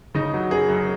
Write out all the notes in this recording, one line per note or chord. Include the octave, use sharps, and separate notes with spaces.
C#3 D#4
F#3
F#2 G#4
F#2